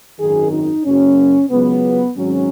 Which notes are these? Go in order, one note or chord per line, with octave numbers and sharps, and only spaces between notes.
G#1 F#2 D#3 G#4
D#4
F#1 F#2 F#3 C#4
C#2 C#3 F#3 B3
G#1 G#2 F#3 C#4